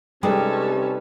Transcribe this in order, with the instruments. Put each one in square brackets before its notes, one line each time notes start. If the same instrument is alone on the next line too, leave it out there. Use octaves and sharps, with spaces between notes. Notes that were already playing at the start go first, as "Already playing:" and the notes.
[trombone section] C3 [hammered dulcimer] G3 D#4 B4 [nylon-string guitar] G#3 [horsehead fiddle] C#4 A4